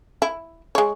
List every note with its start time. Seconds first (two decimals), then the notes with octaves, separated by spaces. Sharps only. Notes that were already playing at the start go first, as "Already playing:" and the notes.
0.22 E4
0.75 G#3 C#5